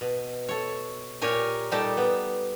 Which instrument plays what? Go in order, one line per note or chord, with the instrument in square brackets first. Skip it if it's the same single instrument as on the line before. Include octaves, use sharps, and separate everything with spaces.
[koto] B2
A4 C#5
A#2 G4 A#4 C#5 G#5
A#2 G3 D#4 G4 A4 A5
B3